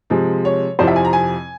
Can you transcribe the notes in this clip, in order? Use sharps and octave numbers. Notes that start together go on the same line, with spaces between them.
C3 F3 G#3
C#5
F2 C3 F3 C4 E4 C5
E5
G#5
A#5
G#5